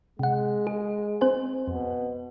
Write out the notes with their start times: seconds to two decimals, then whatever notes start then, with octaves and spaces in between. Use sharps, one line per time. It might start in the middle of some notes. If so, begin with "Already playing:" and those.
0.19 C3 G#3 F#5
0.67 G#4
1.21 C4 C5 G#5
1.68 F2 B2